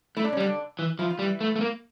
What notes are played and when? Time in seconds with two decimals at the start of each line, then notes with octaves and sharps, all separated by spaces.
0.17 A3 E4
0.24 D4
0.32 C#4
0.37 G3
0.40 D3 D4
0.79 E3
0.99 F3 E4
1.10 F4
1.19 G3
1.22 E3 E4
1.41 A3
1.56 A3
1.61 A#3